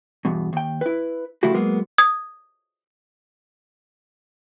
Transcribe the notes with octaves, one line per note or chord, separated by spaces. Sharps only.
E2 G2 B2
D#2 G5
E4 B4
C#3 F3 A3 E4 F#4 G4
F#3 G#3 A#3 B3
D#6 G#6